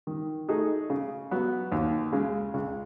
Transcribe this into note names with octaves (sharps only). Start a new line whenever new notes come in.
D#3
A3 D#4 G#4 D#5
C#3
F#3 B3
D#2
C#3 G#3
C#2